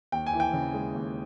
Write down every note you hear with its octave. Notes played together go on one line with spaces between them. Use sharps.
D#2 G5
G#5
E3
G5
C#3
G#3
D#2